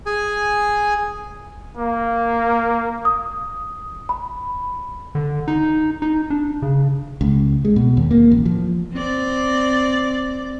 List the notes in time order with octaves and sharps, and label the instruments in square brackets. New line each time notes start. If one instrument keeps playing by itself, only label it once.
[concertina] G#4 G#5
[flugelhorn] A#3
[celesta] D#6
B5
[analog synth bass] D3
D#4
D#4
D4
C#3
[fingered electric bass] C#2
G#3
B2
D#2
A#3
A1
F3
[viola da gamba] C4 D5